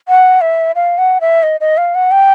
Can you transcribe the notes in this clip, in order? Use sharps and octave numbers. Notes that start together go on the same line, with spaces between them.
F#5
E5
F5
F#5
E5
D#5
D#5
F5
F#5
G5